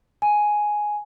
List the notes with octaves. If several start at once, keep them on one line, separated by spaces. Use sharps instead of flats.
G#5